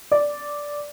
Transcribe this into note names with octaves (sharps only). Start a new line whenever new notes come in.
D5